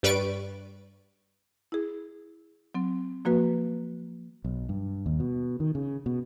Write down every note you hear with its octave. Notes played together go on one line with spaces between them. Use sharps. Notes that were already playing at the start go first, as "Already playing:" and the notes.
G2 G3 B4 D5 C#6 D7
E4 G#4
F#3 C4
F3 A#3 F#4 B4
B1
G2
D#2
B2
D#3
C#3
B2